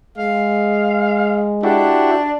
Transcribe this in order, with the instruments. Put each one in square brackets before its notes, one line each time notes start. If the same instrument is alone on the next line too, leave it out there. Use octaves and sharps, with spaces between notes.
[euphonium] G#3 [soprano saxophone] F5
[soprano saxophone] D4 [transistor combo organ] E4 F#4 G4